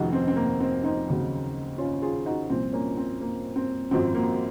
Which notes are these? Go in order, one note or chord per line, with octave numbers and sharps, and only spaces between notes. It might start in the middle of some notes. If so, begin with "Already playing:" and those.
Already playing: F1 F2 D#3 D#4 F#4 G#4
C4
C4
A#3
C4
C4 D#4
D#2 C#3 F#3
C#4 F4
F4 G#4
D#4 F#4
C2 A#2 F3 C4
A#3 C#4
C4
A#3
C4
G#1 F#2 F3 C4
A#3